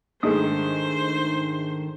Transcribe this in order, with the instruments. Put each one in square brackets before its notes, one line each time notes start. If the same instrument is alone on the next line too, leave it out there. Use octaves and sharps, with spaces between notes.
[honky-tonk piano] G#2 G#3 A3 [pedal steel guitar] D#3 D4 D#6 [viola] C5